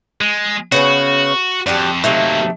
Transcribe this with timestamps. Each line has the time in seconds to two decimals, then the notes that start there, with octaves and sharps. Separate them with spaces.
0.21 G#3
0.72 C#3 B3 C#4 F#4
1.66 F2 D4 F#4 G4
2.04 C3 D#3 F#3 A3 A#3